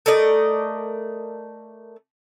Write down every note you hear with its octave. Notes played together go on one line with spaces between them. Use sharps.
A3 A#4 D5 D#5